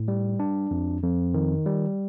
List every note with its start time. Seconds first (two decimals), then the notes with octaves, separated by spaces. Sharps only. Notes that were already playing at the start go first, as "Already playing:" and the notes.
Already playing: A2
0.08 G3
0.40 D4
0.71 F2
1.03 F2
1.34 D#3
1.66 G3